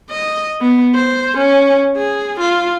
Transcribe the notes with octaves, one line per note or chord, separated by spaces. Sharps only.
D#5
B3
C5
C#4
G#4
F4